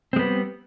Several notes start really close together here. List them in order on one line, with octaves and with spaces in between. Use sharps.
C4 G#3 B3 G3